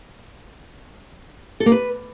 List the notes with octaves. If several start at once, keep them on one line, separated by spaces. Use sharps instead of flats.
A4
A#3
B4